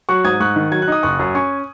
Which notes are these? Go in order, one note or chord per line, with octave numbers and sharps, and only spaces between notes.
F#3 C#6 F#6
G#2 D#6 G#6
G#2 C#6 F#6
D#3
F#3 G#6
F#6
D#4 D#6
F#1 C#6 F#6
F#2
C#4 G#5 C#6